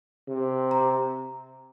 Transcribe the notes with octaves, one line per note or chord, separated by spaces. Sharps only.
C3
A#5